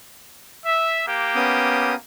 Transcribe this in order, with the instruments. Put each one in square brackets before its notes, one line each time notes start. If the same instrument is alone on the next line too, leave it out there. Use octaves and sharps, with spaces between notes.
[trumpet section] E5
A#3 G4
[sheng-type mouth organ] B3 C#4 D#6